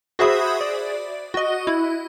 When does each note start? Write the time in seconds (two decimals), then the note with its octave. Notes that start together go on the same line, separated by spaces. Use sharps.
0.19 F#4 G#4 C5 E5 B5 D#6
0.61 D5
1.34 F#4 D#5
1.67 E4